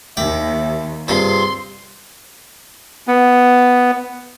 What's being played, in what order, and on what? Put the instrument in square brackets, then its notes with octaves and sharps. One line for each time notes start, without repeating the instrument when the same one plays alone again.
[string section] D#2 [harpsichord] D5 G5 [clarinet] E5
[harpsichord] G2 C3 F4 [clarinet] G#4 [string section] C6
[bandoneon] B3